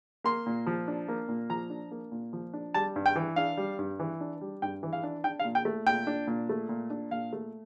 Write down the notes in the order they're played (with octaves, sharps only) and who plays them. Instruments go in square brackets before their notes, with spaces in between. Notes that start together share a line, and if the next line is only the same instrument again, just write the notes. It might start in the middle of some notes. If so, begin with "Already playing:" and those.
[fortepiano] A#3 C6
A#2
F3
D4
A#3
A#2
F3 A#5
D4
A#3
A#2
F3
D4
G3 A5
G2
G5
E3
D4 F5
G3
G2
E3
D4
G3
G2 G5
E3
F5
D4
D4 G5
F5
A#2
G5
A3
A#2 G5
D4
A#2
A3
A#2
D4
A#2 F5
A3